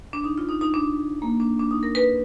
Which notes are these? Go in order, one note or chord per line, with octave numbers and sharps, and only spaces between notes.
D4
D#4
F4
D#4
D#4
D4
A#3
D4
D4
D#4
A#4
B4